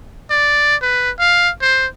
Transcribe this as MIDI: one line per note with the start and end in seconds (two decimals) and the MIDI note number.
0.30 0.76 74
0.82 1.10 71
1.19 1.50 77
1.61 1.86 72